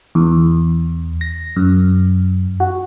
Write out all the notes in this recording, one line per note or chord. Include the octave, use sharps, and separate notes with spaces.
E2
A#6
F#2
F#4